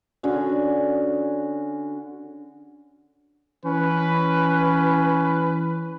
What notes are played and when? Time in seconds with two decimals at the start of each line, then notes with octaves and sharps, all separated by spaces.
0.23 D3 C#4 F#4 G#4
3.65 E3 C#4 B4